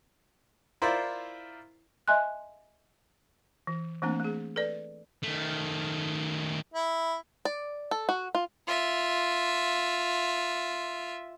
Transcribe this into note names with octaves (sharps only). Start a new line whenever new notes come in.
E4 F4 A#4 C5 D5 E5
D#5 E5 G#5 C6 F#6
E3
E3 A3 A#3 C4 D4
A3 G#4
A4 B4 D5
D#3 A3
E4
D5
A4
F#4
F4
F4 E5